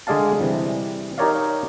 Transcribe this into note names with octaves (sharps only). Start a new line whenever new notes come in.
D3 G#3 G#4 D5 F5 A5
C3 E3 G3
D#4 G4 A#4 C#5 D5 F5